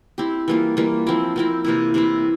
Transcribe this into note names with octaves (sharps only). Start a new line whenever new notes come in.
C4 E4 G4
E3 G3 A#3 F4
E3 G3 A#3 F4
F3 C4 E4 A#4
F3 C4 E4 A#4
C3 E3 A#3 E4
C3 E3 A#3 E4